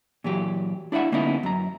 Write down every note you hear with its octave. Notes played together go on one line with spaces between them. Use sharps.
A#2 E3 F#3 G4
D4 E4 D5 E5 F#5
D3 A#3 B3 C#4 D#4 E4
F#2 A#5